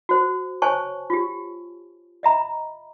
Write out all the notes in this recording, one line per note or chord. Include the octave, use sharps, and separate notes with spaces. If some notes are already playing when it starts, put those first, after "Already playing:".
F#4 C5
C5 C#5 G#5 A5 C#6
F4 G4
D#5 E5 A#5 B5